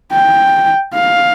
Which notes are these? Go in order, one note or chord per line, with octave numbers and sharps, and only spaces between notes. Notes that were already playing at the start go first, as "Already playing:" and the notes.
G5
F5